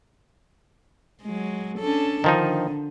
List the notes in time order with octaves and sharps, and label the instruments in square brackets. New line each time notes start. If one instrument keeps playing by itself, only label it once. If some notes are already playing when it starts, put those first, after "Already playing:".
[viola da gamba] F#3 G#3
C#4 D4 A4
[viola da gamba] D3 [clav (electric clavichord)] D#3 F3 D#4